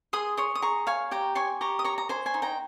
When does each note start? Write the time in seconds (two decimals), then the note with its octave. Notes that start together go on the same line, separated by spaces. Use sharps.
0.13 G#4 C6 D#6
0.37 C#5 C6 D#6
0.55 D#6
0.62 G#4 A#5 C#6
0.87 C#5 F5 G#5
1.11 G4 G5 A#5
1.35 C#5 G#5 C6
1.61 G4 A#5 C#6
1.79 D#6
1.84 C#5 A#5 C#6
1.98 A#5
2.09 C5 G#5 C6
2.26 G#5 C6
2.34 D#4
2.42 G5 A#5